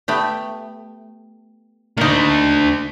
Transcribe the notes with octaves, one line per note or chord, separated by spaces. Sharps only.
A3 B3 G4
D2 D3 A#3 D#4